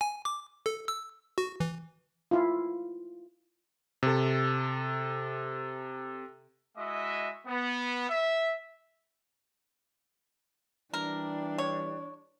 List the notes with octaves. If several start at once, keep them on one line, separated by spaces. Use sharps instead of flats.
G#5
D6
A4
E6
F#4
E3
E4 F4
C3 A4
G#3 E4 F#4 D#5 E5 D#6
B3
E5
E3 G3 D4 A#4
C#5